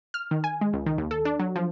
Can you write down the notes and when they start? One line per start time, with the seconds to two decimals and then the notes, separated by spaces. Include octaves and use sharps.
0.14 F6
0.31 D#3
0.44 G#5
0.61 G#3
0.73 C#2
0.86 D#3
0.98 D#2
1.11 A4
1.25 D4
1.39 F#3
1.56 F3